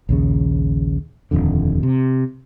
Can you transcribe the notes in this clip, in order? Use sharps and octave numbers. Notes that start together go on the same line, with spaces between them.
A#1 D#2 C#3
D#1 G#1 F2 D3
C3